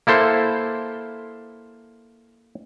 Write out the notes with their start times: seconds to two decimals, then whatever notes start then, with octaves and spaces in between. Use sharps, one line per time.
0.07 A#3 E4 A4 C5